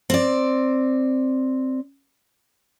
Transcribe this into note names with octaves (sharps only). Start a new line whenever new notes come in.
C4 D5